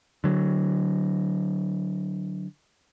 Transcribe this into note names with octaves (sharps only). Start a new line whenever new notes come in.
D3 F#3